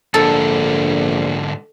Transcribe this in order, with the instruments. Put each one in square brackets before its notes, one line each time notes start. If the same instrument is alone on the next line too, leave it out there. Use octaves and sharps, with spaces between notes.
[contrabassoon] A#1 [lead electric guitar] G#2 D3 [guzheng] A4